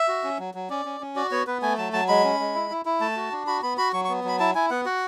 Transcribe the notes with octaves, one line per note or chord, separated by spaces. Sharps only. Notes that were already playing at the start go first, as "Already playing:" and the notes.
Already playing: E5
F#4
C#4
F#3
F#3
C#4 D5
C#4
C#4
F#4 D5
B3 C#5
B3 B4
A3 G#5
F#3 A5
F#3 A5
G#3 B5
C#4
G#3
E4
E4
E4
A3 A5
F#4
D4
F#4 B5
B3 B5
F#4 B5
F#3 C#6
C#6
B3
F#3 B5
E4 A5
E4 G#5
B3 F#5
F#4 F#5